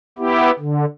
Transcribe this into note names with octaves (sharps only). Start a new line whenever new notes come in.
B3 E4 G4
D3